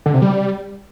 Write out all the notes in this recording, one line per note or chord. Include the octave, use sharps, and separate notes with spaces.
D3
C3
G3